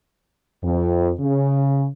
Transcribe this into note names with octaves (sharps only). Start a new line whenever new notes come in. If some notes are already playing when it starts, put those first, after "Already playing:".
F2
C#3